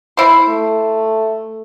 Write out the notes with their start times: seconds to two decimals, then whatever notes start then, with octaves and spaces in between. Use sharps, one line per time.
0.17 E4 C5
0.49 A3